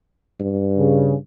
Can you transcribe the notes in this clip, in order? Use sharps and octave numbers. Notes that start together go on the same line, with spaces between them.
G2
C#3